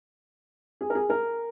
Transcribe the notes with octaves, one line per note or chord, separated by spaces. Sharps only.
G#4
A#4
G#4
A#4